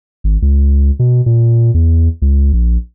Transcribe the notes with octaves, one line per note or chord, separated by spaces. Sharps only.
G#1
C#2
B2
A#2
E2
C#2
A#1